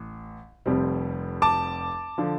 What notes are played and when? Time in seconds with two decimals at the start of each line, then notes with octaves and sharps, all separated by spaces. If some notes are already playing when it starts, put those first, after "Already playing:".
Already playing: A1
0.66 F1 F2 C3 G3 C4
1.42 A5 D6
2.18 D3 F3